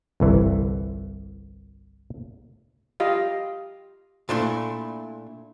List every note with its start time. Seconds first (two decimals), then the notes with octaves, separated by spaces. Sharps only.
0.20 G1 C2 E3
3.00 F4 G4 D#5 F5
4.29 A#2 A3 D4 E4 C6